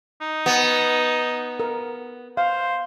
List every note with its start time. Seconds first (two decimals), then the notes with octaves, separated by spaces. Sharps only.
0.21 D#4
0.46 B3
1.60 A#4
2.37 C5 F5